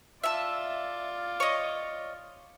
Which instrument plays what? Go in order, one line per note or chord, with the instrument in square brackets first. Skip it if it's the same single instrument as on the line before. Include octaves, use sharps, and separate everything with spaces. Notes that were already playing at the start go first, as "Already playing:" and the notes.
[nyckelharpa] F4 D5 [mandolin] E5 A5
[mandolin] C#5 D#5